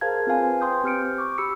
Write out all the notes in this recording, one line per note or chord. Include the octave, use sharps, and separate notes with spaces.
G#4 A#4 C5 F5 A5 G#6
C4 F4 B4 F5 G#5
B4 C5 G5 C6 D#6 G6
C4 G4 F6 G6 C#7 D7
C#6 D6
G4 B5 E6 C#7